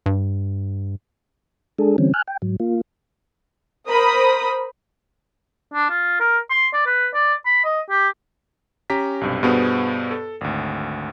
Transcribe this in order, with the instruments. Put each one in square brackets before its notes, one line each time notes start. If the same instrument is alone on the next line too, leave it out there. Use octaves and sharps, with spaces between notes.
[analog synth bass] G2
[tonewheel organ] G#3 D4 G#4 A4
D3 E3 G3 C4 C#4
G#5 F6 F#6
G5
G#2 F#3
A#3 F4
[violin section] A#4 C5 B5 D#6
[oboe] D4
F4
A#4
C6
D5
B4
D5
B5
D#5
G4
[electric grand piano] C#4 G4 A#5 B6
B1 G2 C3
G2 B2 B3 G#4 C5
A4
G#1 D2